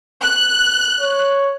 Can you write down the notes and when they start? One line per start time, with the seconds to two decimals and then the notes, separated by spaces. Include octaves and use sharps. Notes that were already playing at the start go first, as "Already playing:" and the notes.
0.22 F#6
1.01 C#5